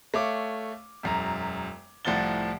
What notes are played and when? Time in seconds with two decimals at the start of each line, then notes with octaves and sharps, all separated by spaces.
0.14 A3 C#5 F5 D6
1.03 E1 F#2 A#5
2.05 C2 A2 F3 F#5 A6 G7